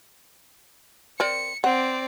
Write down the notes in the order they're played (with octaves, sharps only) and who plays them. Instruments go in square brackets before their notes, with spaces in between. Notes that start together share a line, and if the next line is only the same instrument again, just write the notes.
[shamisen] C4 A#4 D5 [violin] C#7
[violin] C4 D5 [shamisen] F#5